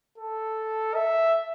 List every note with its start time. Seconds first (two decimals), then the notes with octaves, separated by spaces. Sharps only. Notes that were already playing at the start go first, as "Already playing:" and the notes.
0.18 A4
0.95 E5